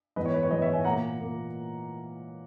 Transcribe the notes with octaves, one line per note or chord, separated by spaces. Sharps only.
G#2 E3 G#3 B3 B4 D#5
C#5
B4
C#5
G#2 E3 G#3 B3 B4 D#5
C#5 E5
E5 G#5
A#2 A#3 F#5 A#5
A#2 A#3